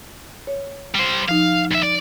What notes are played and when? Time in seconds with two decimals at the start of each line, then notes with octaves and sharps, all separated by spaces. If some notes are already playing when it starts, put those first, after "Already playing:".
0.47 C#5
0.95 G3 C5
1.29 F3 D#4 F5
1.71 D#2 E5
1.83 D5